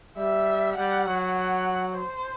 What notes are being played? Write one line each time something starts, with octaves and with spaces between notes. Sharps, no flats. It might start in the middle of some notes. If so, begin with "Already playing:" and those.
G3 E5
G3 F#5
F#3
F#5
C5